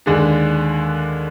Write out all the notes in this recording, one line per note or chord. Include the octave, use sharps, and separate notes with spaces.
D#2 D3 G#3 D4